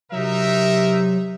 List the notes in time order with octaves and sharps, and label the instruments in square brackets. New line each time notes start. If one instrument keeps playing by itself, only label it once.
[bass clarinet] C3 [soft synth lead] F#3 [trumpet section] D#4 A#4 E5